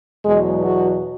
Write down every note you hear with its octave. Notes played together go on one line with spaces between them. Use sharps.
E2 B2 F#3 G#3
F#4